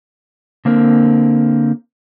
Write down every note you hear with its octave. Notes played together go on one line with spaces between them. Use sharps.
D3 A#3 C4 A#4